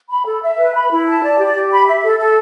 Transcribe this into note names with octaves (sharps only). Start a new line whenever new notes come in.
B5
A4
E5
B4
B5
E4
A5
D5
G4
G4
B5
E5
A4
A4